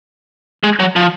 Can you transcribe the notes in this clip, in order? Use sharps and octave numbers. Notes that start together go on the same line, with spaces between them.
G#3
F#3
F3